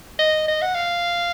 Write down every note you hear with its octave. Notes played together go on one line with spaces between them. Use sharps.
D#5
D#5
F#5
F5